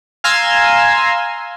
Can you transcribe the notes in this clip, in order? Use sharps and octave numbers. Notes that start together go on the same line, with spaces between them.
F5 G#5 A#5 C6 E6